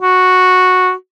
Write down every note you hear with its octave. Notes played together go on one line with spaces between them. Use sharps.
F#4